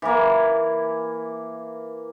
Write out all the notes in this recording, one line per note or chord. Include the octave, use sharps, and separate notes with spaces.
E3 A#3